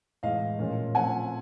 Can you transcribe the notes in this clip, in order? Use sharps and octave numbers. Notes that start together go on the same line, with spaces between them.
A2 E3 G#3 D#5 F5
A#2 F3 A3 C#4
F3 A3 C4 F#5 G#5